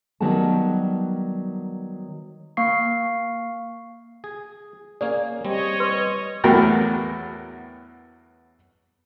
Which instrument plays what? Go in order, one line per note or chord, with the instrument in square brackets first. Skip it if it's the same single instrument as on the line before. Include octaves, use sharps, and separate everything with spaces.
[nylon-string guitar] D#3 F#3 G3 B3 F#5 A5
[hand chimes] A#3 F5 C#6 C7
[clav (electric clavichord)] G#4
[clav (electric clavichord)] A#3 C#4 G#4 [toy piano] D5
[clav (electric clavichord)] G3 C4 [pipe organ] C#5 D#5
[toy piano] B4 C6
[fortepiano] E2 A2 F#3 B3 A#4 G5